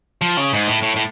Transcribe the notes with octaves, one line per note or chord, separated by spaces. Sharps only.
F3
C#3
G#2
A2
A2
A2